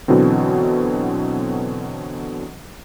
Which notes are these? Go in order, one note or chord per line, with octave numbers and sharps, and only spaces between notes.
B2 D3 E3 F#3 C4